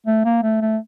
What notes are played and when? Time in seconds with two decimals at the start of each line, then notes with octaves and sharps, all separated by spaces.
0.07 A3
0.25 A#3
0.43 A3
0.61 A3